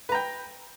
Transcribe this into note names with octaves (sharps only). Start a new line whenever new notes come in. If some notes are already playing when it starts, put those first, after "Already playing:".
B4 G5 A#5